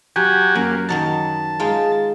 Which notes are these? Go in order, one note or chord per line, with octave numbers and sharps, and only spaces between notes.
F#3 F#4 G4 G#5
F#2 A#3
D#3 F#3 D#4 A5
G#3 D#4 F4